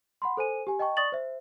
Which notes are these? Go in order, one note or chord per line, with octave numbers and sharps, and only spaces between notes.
F#5 B5 C6
A4 C5 G#5 D#7
G4 G#5
D#5 G5 A5 C#6
D5 C#6 D#6 A6 F#7
C5 E5